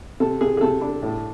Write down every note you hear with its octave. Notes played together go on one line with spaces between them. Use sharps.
C3 A4
C3 G#4
G#4
C3 A4
D4
A2